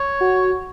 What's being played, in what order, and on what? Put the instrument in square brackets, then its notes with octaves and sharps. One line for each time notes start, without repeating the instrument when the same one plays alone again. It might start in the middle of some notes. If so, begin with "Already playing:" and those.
Already playing: [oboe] C#5
[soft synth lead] F#4